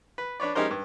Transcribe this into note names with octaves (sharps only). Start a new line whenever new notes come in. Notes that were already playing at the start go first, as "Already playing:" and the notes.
B4
D4 B4 C#5 D5
G#3 C#4 D#4 G4 A#4 C5
G2